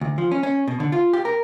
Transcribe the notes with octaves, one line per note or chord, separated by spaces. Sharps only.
D2
F3
C#4
C#4
B2
D3
F4
G4
A#4